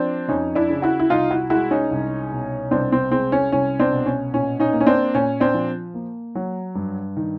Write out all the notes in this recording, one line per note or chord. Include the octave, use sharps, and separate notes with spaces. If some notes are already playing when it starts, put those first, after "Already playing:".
Already playing: F3 C4 D4
F2 C#4 D#4
D4 E4
C#3
E4 F#4
E4
C2 D#4 F4
E4 F#4
G#3 E4 F#4
C#4 D#4
C2
B2
C2 C4 D4
C4
G#3 C4
C#4
C2 C#4
C4 D4
B2
C#4
A#2 C#4
C#4 D#4
A#3
C#4
C4 D4
A#2 C#4
C4 D4
F3
A#3
F#3
G2
D#3